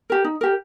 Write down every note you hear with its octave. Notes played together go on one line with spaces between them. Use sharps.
G4 A#4
D#4
G4 A#4